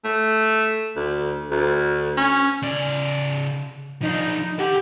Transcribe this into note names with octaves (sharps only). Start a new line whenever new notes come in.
A3
D2
D2
C#4
C#3 D5
F3 D4 D#4
G4 A4 F#5